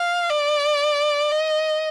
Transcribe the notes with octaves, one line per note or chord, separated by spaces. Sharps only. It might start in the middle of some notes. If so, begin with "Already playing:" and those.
Already playing: F5
D5
D#5